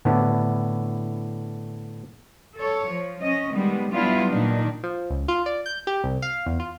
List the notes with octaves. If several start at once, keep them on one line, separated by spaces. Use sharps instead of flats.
A2 D3 B3 E4
A4 C#5
F3
C#4 D#5
D#3 G3 G#3 B3
F#3 G3 B3 D4 E4 F4
A#2 D#3 D4 D#4
F3
C#2
F4
D5
G6
G4
C2
F5
E2
F4